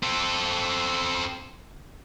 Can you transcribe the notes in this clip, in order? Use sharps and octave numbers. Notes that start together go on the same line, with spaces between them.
C4 A4